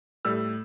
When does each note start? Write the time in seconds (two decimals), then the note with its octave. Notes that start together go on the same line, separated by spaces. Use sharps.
0.25 A2 G3 E6